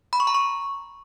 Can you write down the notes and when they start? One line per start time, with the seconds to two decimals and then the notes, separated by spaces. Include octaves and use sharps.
0.13 B5
0.20 C#6
0.27 A#5
0.35 C#6